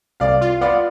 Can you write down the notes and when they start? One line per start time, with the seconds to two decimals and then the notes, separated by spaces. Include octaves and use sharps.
0.20 C2 D5 F5
0.41 F4
0.61 B3 D5 F5